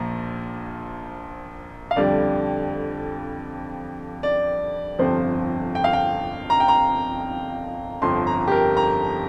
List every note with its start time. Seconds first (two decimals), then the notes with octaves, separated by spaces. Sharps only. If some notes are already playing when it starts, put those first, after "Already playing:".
Already playing: A#1 A#2 F3 A#5
1.91 F5
1.96 F2 D3 G3 D5
4.23 D5
4.99 G1 F2 C3 F3 C5
5.75 G5
5.84 F5
5.93 G5
6.50 A#5
6.60 G5
6.68 A#5
8.02 G1 F2 F3 C6
8.27 A#5
8.48 G4
8.52 A#4
8.77 A#5